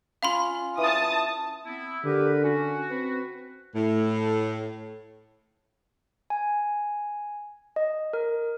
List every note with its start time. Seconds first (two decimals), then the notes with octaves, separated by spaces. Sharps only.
0.23 C#4 F4 F5 B5 C6
0.78 E3 A5 D#6
1.66 B3 C4 E4
2.05 D3 G4 A#4 B4
2.43 C#4 F#4
2.90 C4 B4
3.74 A2
6.30 G#5
7.76 D#5
8.13 A#4